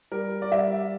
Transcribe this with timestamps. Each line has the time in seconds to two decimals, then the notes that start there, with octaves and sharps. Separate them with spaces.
0.12 G3 A#4
0.42 D5
0.51 G3 E5